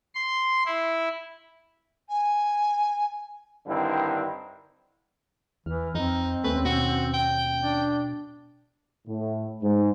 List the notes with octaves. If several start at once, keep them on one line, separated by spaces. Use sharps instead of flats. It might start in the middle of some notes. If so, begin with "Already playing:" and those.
C6
E4
G#5
G2 D3 D#3 C4 E4
E2 E3 F6
F2 C4 D#4
D#2 A3 B3 C#4 B4
B2 F#4
G5
D4
A2
G#2